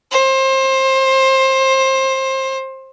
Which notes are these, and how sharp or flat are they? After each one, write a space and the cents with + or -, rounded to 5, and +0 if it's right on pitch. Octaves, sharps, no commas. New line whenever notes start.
C5 +25